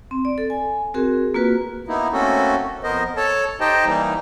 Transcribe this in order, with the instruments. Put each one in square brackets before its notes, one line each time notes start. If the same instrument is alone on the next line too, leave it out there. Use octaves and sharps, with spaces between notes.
[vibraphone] C4
D5
A4
G#5
C4 F#4 G#4 A#4
A#3 F4 F#4 B4
[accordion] A#3 B3 D#4 E4
A3 A#3 C4 C#4 F#4 A4
F2 B3 A#4 C5 D#5
A4 C#5 A5
D#4 G4 C5 D#5 G5 A5
E3 G3 A#3 D#4